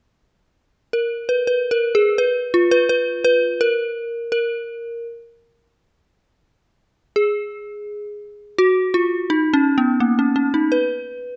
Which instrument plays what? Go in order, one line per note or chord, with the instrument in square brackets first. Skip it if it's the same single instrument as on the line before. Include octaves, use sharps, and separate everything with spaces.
[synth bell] A#4
B4
B4
A#4
G#4
B4
F4
B4
B4
B4
A#4
A#4
G#4
F#4
F4
D#4
C#4
B3
A#3
C#4
C#4
D#4
B4